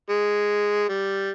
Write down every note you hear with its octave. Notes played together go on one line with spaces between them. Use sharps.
G#3
G3